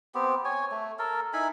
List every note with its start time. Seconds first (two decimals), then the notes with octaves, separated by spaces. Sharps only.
0.15 B3 C4 G4
0.45 C#5 G#5
0.71 A3
0.99 A4 A#4
1.33 D#4 E4 G#5 B5